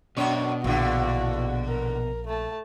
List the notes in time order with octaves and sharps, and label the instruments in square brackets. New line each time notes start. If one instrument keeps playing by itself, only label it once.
[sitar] F#2 C#5 [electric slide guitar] B2 [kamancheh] D4
[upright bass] A#1 [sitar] E2 D3 [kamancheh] F#4 F5
[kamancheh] A#4
A3 A5